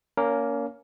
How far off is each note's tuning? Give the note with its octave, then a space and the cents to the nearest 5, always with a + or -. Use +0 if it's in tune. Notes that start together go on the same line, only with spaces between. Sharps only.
A#3 +0 C#4 +30 A#4 +0